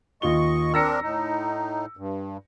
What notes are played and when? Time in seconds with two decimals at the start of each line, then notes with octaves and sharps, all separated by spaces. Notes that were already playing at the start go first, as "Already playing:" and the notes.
0.22 D#2 F4 D#5 C#6 G7
0.74 C4 D4 A#4 E6 A#6 C#7
1.02 A2 D#4
1.97 G2